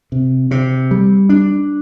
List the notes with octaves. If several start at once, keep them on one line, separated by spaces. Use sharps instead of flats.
C3
C3
G3
D4